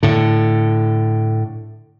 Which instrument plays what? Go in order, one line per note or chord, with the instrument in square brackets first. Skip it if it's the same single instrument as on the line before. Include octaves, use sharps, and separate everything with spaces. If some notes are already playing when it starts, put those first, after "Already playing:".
[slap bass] A2 D3